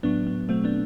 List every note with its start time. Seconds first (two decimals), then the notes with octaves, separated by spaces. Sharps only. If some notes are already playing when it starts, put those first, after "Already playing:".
0.03 A2 F#3 B3 D4
0.27 B3
0.49 B2 F#3 A3 C4
0.64 B3 D4